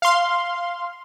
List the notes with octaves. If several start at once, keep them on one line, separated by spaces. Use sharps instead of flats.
F5 C6